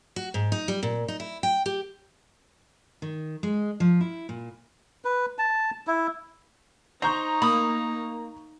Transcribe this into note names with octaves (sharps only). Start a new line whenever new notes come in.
F#4
G#2
D#4
G3
A#2
D#4
E4
G5
G4
D#3
G#3
F3
E4
A#2
B4
A5
E4
D#4 C5 A#5 C#6 G6
A#3 B5 D#6